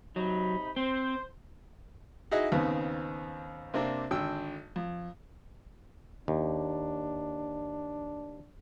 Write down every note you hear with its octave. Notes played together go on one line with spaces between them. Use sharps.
C3 F#3 D#4 B5
C4 C5
D#4 E4 F#4 G#4 D#5
D#2 C#3 B3 C4
C3 A#3 C4 D4
G#1 D3 G5 E6
F2
D#2 D4